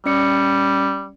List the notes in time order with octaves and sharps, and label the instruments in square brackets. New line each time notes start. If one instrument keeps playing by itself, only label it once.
[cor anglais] G3 [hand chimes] C#4 D5 C#7